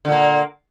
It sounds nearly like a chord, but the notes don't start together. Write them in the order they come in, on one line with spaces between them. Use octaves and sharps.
D3 A#2 A#3